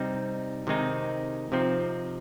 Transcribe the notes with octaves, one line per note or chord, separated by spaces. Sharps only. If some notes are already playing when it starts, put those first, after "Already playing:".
Already playing: C3 G3 C4 D#4
C3 D#3 G#3 C4 D#4
C3 F3 C4 D#4